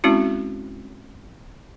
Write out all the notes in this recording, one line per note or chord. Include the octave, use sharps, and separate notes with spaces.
G#3 C4 C#4 E4 F#4